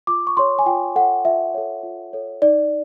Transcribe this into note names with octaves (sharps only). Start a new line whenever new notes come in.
F4 D6
C#6
A4 C#5 C6
G#5
F4 G5
A4 C#5 F#5
F4 E5
A4 C#5
F4
A4 C#5
D#4 D5